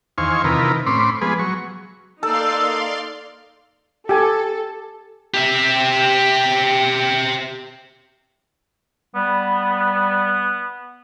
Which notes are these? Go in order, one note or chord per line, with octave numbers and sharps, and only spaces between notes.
E2 D#3 C5 F5 G#5 C#6
C3 D#3 E3 F4 A#4 B4
A2 C4 C#4 B5 C6 D6
F3 G#3 B3 G#4 B4
F#3 C#6
A#3 D#4 A4 D5 F5 C6 E6
G4 A4 G#5
G4 E5
G3 B3